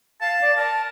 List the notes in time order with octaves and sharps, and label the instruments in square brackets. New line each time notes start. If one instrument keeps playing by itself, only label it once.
[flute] F5 [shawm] A5
[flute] D5
[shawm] A#4 [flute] A5